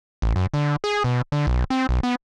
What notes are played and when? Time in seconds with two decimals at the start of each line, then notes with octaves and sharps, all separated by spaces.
0.22 A1
0.36 F#2
0.54 D3
0.84 G#4
1.04 B2
1.32 D3
1.47 B1
1.70 C4
1.89 B1
2.03 B3